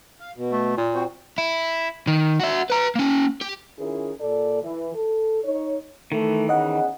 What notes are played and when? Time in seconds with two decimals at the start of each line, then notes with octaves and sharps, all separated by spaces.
0.20 F5
0.36 B2
0.51 A3
0.77 A#2
0.95 C4 F#4 C5
1.38 E4
2.07 D#3
2.40 F#4 E5
2.70 B4 A#5
2.95 A#3 C#4
3.41 G4
3.79 D#3 C#4 E4 F4 G#4 A#4
4.20 A#2 A4 D5
4.63 E3
4.95 A4
5.44 D#4 C#5
6.12 D#3 E3 A3
6.49 E2 C#3 D#5 F#5